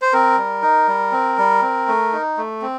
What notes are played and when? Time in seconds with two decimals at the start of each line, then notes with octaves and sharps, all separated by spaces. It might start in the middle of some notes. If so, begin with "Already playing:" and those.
0.02 C5
0.13 C4 A#4
0.37 G3
0.62 D#4
0.88 G3
1.12 C4
1.38 G3
1.62 C4
1.88 A3
2.13 D#4
2.38 A3
2.62 C4